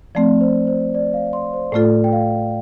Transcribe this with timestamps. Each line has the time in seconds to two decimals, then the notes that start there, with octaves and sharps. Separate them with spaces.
0.15 F3 A3 C4 D5
0.41 C5
0.67 C5
0.94 D5
1.14 F5
1.33 C6
1.53 C5
1.72 A2 A3 F4 A4 D5
2.04 G5
2.13 F5